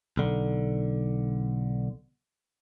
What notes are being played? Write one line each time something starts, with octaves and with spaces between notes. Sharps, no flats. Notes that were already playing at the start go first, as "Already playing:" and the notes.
B1 D3